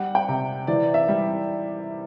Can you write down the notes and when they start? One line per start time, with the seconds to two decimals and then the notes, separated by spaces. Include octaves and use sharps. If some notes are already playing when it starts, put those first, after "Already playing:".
Already playing: G3 F#5
0.15 G5
0.28 C3
0.67 E3 D5
0.94 E5
1.08 G3